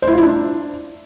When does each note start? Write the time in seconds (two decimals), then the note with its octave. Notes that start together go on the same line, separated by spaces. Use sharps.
0.02 C5
0.07 E4
0.13 F4
0.18 E4
0.23 D4